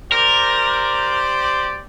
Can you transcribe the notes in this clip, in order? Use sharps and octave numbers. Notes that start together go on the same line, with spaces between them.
G4 A#4 C5 D5